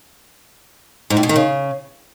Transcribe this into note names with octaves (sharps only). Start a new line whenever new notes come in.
G#2
A2
B2
D#3
C#3